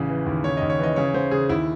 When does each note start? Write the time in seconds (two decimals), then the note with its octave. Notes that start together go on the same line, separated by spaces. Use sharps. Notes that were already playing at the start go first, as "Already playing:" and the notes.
Already playing: A1 C#3
0.09 E3
0.26 D#2
0.44 C#3 C#5
0.57 D#2 D#5
0.70 C#5
0.79 E3 D#5
0.96 C#3 C#5
1.14 C#3 C5
1.31 C#3 G#4
1.49 D#2 E4